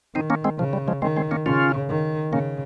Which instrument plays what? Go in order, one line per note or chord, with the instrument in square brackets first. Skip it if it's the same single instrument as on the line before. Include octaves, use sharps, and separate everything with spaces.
[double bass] D#3 [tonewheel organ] C4 D#4
[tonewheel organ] A#3 C#4
G#3 C4
[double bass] C#3 [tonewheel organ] F3
[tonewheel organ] G3
F3 G#3
[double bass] D#3 [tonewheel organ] G#3 C4
[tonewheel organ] G#3 C4
A#3 C#4
[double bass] C#3 [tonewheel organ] C#4 F4
[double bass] D#3
[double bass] C#3 [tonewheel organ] A#3 C#4